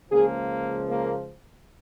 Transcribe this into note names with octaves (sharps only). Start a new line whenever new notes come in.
C#2 C#3 F3 A#3 G#4
A#3